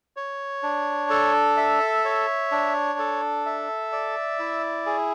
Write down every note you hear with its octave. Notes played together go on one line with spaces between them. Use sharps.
C#5
D4
A4
E5
C#5
D4
A4
E5
D5
E4
G#4